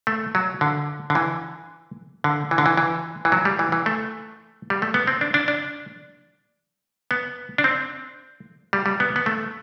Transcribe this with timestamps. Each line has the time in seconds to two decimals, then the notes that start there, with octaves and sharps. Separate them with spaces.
0.07 A3
0.35 F#3
0.61 D3
1.10 D3
1.15 E3
2.24 D3
2.51 E3
2.58 D3
2.66 E3
2.77 E3
3.25 E3
3.32 F#3
3.45 G3
3.59 E3
3.72 E3
3.86 A3
4.70 G3
4.82 A3
4.94 B3
5.07 C4
5.21 D4
5.34 D4
5.48 D4
7.11 B3
7.58 D4
7.64 C4
8.73 G3
8.86 G3
9.00 B3
9.16 B3
9.26 A3